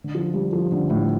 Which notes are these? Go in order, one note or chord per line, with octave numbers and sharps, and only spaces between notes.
D3
F3
G3
F3
D3
A2